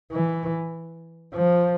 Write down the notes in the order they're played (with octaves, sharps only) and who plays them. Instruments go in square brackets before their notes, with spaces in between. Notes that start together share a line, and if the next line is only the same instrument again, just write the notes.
[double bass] E3
F3